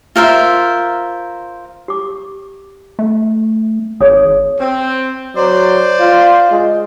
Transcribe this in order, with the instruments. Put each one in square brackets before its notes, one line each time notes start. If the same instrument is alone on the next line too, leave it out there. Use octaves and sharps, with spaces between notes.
[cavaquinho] F4 A#4 C5 E5
[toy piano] G4 D6
[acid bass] A3
[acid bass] G#1 [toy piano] G#4 C#5 D#6
[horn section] C4
[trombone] F#3 [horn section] C5 D5
[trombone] F4
G#3